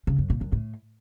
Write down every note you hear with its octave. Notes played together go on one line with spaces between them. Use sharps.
C#3
F#2
A#2
F#2
A2